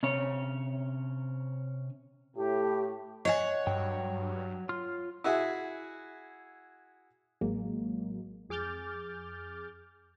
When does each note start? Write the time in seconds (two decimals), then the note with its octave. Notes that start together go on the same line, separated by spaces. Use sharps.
0.03 C3 C#4 C#5
2.36 A2 G4
3.25 C#5 D#5 F#5 G#5
3.67 G2 F#3 G5
4.69 F4 C6 F6
5.24 E4 F#4 G#4 E5
7.41 A1 F#3 G#3 A#3
8.49 F2 G#4 D6 F6 G6 A6